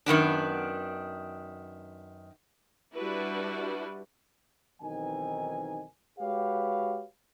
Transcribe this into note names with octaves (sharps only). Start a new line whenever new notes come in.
F#2 D#3 B3 D4
G3 D4 E4 F#4 B4
B1 D#3 E3 C4 D#4 G#5
G#3 F#4 G4 B4 C#5 F5